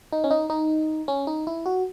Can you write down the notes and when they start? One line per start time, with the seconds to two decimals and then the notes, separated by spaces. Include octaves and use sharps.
0.12 D#4
0.24 C#4
0.31 D#4
0.50 D#4
1.08 C#4
1.27 D#4
1.47 E4
1.66 F#4